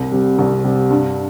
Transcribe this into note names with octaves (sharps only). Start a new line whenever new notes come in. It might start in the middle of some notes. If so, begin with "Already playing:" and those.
Already playing: C2
C3 G3
C2
C3 G3
G2